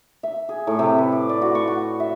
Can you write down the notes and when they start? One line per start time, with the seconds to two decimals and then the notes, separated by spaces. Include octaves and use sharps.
0.23 E5
0.49 G#4
0.67 A2
0.79 C3
0.98 B4
1.12 D6
1.29 D5
1.42 F#4
1.55 C#6
1.68 F#4
2.00 E5